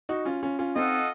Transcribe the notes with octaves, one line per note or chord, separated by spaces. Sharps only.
D#4 F#4
C#4 F4
C#4 F4
C#4 F4
C4 D#4 F4 A4 D#5 F#5